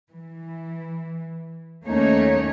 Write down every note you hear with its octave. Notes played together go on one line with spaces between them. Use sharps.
E3
D#2 A3 A#3 C#4 D#4 C#5